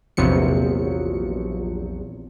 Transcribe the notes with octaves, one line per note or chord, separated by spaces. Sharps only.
A#1 E2 C3 F3 F#3 C#7